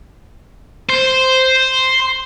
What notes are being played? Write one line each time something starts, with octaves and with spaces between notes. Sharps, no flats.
C5